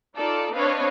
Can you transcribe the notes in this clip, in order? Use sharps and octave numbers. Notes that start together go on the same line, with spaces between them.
D#4 F4 A4 D5
C4 D4 B4 C#5 D#5 F5